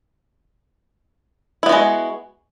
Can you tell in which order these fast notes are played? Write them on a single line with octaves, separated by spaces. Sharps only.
E4 B3 F#4 G#3